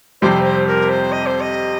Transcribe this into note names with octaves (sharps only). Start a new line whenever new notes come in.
F2 C3 G3 C4 G4 C5
C5
A#4
C5
D#5
C5
D#5